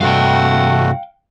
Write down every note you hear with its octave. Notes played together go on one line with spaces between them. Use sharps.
G2 C3 A3 F#4 F5 G5